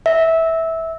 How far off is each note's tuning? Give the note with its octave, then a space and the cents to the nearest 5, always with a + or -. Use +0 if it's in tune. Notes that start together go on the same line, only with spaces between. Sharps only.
E5 -15